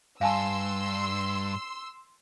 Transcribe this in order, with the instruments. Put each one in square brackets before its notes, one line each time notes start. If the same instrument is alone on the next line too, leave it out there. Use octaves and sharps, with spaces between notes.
[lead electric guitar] G2 [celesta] F5 G#5 A5 [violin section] C6 E6